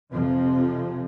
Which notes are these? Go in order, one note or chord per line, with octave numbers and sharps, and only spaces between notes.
F2 C3 F3